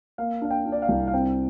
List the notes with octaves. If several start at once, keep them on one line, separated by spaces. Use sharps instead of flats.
A#3 F5
D4 F5
G5
D4
D5
F5
C2
F5
C4 G5